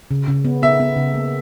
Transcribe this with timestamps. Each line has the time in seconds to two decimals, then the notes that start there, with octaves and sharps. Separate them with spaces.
0.11 C#3
0.28 C#3
0.45 B3
0.62 B3 E5
0.80 B3
0.97 C#3
1.14 A#3